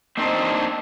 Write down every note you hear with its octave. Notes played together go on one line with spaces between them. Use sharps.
A#3 C4 D4 D#4 C5